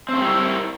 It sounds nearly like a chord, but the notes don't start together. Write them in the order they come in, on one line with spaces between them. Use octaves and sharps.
C4 A3 G3 E4 A#4